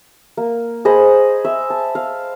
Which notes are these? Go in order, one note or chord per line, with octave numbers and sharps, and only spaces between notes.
A#3
G#4 C5 D#5 B5
E5
A5
F5